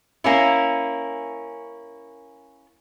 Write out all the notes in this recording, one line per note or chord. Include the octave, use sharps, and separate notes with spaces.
A#3 C#4 E4